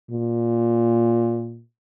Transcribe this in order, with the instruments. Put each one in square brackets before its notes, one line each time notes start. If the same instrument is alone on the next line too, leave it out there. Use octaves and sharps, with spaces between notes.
[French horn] A#2